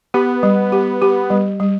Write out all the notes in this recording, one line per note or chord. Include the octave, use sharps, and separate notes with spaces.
B3 G4
G3
G4
G4
G3
G3